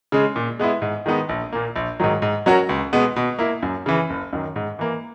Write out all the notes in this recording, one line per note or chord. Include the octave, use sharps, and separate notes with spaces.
C#3 G#3
A#2
G#3 B3 E4
G#2
D#3 G#3 B3 D#4
A#1
A#2 A#3
A#1
G#2 D#3 F#3
G#2
F#3 C#4 F#4 A#4
C#2
B2 G#3 B3
B2
A#3 E4
F#2
C#3 E3
F#1
F#2 D#3
G#2
E3 A#3